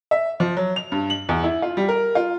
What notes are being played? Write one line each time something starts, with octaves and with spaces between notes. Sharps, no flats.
E5
F3
F#3
F7
G2
F#7
E2
E4
F4
G3
A#4
F4